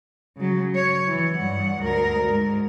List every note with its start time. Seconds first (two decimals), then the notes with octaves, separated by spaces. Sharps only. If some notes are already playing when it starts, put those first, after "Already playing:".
0.37 C#3 F#3
0.75 C#5
1.07 E3
1.36 G2 F#5
1.82 D2 A#4
2.26 G#2